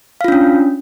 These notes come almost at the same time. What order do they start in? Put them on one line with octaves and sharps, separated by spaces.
F5 F4 D4 C#4